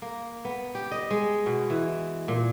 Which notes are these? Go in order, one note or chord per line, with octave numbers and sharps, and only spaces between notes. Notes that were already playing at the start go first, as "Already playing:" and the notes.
A#3
B3
G4
D#5
G#3
B2
E3
A#2